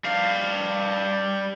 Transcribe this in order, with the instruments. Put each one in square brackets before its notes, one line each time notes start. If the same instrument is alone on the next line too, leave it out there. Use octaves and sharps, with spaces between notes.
[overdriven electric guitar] G3 F5